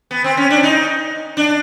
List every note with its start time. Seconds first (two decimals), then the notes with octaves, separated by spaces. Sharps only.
0.11 B3
0.24 C4
0.37 C#4
0.50 D4
0.63 D#4
1.37 D4